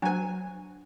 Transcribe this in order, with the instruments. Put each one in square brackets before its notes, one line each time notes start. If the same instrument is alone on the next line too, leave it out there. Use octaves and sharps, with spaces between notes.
[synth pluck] F#3 G#5 [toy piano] D4 C5